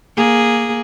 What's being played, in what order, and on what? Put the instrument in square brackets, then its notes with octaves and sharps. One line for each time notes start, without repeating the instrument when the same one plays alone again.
[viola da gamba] A#3 G#4